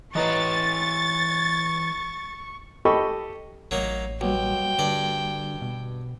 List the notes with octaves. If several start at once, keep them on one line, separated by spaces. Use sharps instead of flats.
E3 E4 B4 C#5 D#5 A#5 C#6 A6
G4 A4 D#5 B5 C#6
A1 F#3 A#3 D#4
B1 G3 A#3 F#4 G5
G2 D3 D5
B2